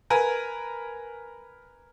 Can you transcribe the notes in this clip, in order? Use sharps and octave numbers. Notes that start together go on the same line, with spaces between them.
A#4 B4 G#5